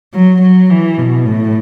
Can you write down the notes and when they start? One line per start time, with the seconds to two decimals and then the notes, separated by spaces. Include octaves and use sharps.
0.14 F#3
0.42 F#3
0.70 E3
0.98 B2
1.26 A2